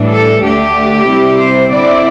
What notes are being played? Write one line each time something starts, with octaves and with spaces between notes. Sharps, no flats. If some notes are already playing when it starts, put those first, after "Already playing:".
Already playing: A2 E3 G3 D4
A4
D2 D3 A3 D4 G4
C3 G3 C4 E4
C5
D3 C4 E4 D5